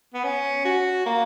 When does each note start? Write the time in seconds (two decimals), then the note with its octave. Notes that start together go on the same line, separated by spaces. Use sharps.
0.14 B3
0.24 C#4
0.65 F#4
1.06 A#3